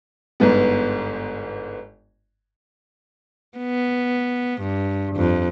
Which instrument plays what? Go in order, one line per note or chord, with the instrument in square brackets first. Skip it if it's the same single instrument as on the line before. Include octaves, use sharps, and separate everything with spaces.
[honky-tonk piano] G1 G#2 B3
[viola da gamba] B3
G2
F2